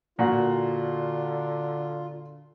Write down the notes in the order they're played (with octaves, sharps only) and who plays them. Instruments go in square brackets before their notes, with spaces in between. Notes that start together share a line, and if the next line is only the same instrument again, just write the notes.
[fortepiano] A#2 F#4 [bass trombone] D3 [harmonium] F4